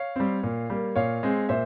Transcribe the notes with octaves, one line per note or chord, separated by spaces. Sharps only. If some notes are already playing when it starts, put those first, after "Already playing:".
Already playing: C#5 F5
G3 C4
A#2
G3 A#3
A#2 C#5 F5
G#3 C4
A#2 C5 E5